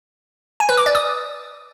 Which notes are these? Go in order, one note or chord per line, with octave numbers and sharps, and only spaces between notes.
G#5
B4
D6
D5
D#6